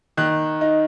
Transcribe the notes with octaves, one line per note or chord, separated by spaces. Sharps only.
D#3 F#6
D#4